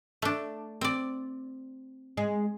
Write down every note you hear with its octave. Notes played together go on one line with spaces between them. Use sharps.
A3 D4
C4 D5
G#3